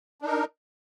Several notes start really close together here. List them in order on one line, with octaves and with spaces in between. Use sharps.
D4 D#4 A#4